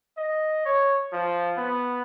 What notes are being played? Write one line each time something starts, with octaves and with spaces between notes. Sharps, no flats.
D#5
C#5
F3
B3